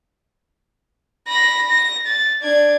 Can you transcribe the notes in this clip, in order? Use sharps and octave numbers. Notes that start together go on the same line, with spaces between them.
B5 A#6
A#6
A6
D4 G#6